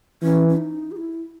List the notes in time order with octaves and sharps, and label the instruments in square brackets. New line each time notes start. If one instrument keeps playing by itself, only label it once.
[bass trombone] E3 [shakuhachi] C#4
[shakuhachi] C#4
D#4
G#4
E4